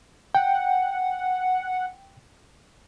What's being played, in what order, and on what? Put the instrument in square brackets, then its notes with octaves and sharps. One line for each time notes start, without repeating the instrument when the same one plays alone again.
[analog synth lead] F#5 [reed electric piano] G5